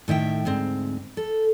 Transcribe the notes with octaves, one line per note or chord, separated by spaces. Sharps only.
A2 D#3 E5 G5
D2 G#2 C4
A4